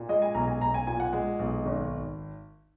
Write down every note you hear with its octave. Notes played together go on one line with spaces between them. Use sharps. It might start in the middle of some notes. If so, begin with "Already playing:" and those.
Already playing: A#2
G#3 D#5
G#5
B1 A#5
G#5
B1 A#5
G#5
A#2 G#5
F#5
G#3
B1
G#1